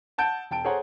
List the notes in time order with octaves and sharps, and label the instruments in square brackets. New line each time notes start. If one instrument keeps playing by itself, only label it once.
[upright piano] F#5 A5 G6 D7
E1 G5 A5 D7
G#4 A4 C5 C#5 F#5 A#5